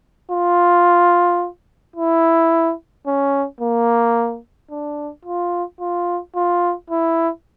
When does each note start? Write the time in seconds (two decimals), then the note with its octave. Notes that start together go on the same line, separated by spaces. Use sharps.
0.31 F4
1.96 E4
3.06 C#4
3.61 A#3
4.71 D4
5.25 F4
5.80 F4
6.35 F4
6.90 E4